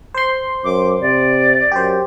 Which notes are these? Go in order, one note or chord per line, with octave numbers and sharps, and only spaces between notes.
C5 C6
F#2 D6
C3 D5
F#2 G4 C5